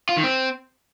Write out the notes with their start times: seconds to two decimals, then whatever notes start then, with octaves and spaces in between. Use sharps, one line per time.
0.09 F4
0.16 D#3
0.24 C4